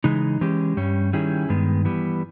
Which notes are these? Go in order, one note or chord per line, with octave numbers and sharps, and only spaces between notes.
C#3 E3 G#3 D#4
E3 G#3 C#4 G4
G2 G3 C#4
D#3 G3 C#4 E4 G#4
G2 D#3 G#3 B3
E3 G3 B3